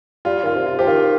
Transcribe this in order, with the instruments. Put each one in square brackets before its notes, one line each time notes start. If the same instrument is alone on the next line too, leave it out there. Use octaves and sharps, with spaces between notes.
[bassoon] G3 [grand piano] F4
[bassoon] D#3 [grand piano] F4
[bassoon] C3
[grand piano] F4
[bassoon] F3 [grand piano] G4
[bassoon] D#3 [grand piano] F4